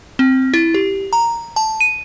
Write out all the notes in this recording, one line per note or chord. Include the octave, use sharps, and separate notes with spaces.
C4
E4
G4
A#5
A5
D#7